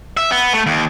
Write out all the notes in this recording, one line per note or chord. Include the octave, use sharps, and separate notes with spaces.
E5
B3
A3
D#2